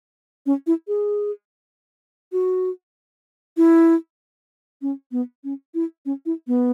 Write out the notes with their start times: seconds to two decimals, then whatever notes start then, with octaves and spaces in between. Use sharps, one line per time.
0.46 C#4
0.67 E4
0.88 G#4
2.32 F#4
3.57 E4
4.82 C#4
5.12 B3
5.44 C#4
5.75 E4
6.06 C#4
6.26 E4
6.47 B3